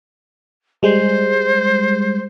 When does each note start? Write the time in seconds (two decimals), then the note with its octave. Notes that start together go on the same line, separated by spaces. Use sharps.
0.83 G3 G#3 C5